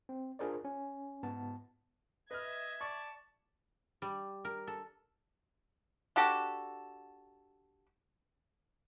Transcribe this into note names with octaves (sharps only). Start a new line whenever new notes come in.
C4
D4 F4 G#4 A#4 C5 D5
C#4
G#2 B3 A5
B4 D#5 E5 F6 G#6
D5 A5 C#6
G3
A#4
A4
D4 F#4 G4 A4